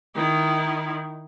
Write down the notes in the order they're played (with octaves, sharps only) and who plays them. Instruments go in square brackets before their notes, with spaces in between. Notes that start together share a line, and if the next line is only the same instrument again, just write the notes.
[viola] D#3 E4